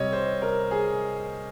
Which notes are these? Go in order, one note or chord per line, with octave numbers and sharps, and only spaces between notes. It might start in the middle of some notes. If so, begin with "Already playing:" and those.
Already playing: C3 G3 C#5 D#5
C5
A#4
G#4